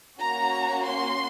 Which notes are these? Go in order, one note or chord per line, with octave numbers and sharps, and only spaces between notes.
A#3 C#4 F#4 A#5
C6